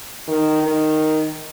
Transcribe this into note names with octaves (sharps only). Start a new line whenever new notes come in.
D#3
D#3